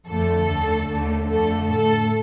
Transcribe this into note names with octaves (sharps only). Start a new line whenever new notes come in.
F2 D3 A3 A4
D#2 D3 A3
D#2 D3 A3
F2 D3 A3 A4
A2 A3 A4